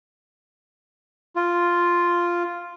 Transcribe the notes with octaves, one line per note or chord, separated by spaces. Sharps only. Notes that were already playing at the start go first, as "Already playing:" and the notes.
F4